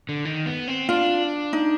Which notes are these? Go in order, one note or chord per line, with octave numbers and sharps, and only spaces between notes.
D3
D#3
B3
C4
D4 F4
D#4